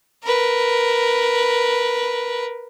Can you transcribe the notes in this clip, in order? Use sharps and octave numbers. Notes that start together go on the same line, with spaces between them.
A#4 B4